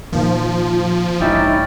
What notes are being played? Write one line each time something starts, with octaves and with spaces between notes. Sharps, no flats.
A#2 D#3 F3 A#3
A1 G2 C#4 D#4 E4 D5 E5 G5